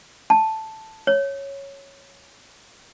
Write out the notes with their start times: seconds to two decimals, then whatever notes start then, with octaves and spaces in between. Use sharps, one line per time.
0.30 A5
1.07 C#5